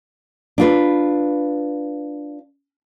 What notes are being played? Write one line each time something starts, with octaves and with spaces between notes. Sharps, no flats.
D4 F4 B4